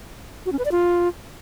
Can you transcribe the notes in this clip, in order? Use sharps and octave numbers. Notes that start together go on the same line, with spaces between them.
F#4
C#4
B4
D5
F4